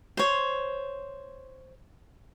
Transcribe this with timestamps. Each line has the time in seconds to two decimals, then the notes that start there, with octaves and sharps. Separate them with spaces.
0.17 C5 C#5